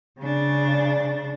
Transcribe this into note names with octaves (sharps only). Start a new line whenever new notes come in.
C#3 D4